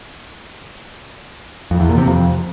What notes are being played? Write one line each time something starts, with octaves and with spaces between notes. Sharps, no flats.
F2
E2
A#2
C3
F2